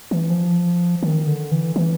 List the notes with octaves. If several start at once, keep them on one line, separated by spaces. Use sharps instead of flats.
E3
F3
D#3
D3
E3
E3